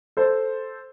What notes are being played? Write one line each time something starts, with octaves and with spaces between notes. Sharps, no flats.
A4 C5